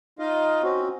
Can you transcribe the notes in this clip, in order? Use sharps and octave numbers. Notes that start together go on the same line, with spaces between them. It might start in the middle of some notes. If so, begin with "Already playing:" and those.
D#4 F4 D#5 F5
C4 C#4 F#4